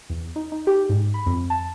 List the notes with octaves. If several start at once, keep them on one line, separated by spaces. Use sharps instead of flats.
E2
D#4
D#4
G4
G#2
B5
F2
A5